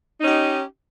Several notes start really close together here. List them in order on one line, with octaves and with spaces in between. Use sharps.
D#4 C#4 G4